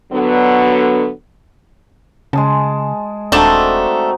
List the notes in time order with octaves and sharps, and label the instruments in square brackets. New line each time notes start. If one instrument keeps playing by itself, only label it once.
[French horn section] D3 F#3 B3
[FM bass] C#3 [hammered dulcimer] G#3 G#4 A5
[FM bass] D#1 [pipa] A3 D4 A5 [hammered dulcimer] C4 D#4 F#4